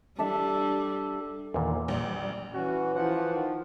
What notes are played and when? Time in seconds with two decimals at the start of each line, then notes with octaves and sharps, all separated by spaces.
0.19 G3 D4 A4 E5
1.54 E2 A#2 D#3 E3
1.88 A#1 G3
2.54 E3 C#4 F#4
2.95 E3 F3 F#5
3.31 D#3